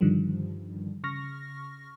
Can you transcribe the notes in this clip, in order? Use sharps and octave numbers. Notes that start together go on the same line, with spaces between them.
G2 D3 D#3 F3 G3
C#3 C#6 F6 A#6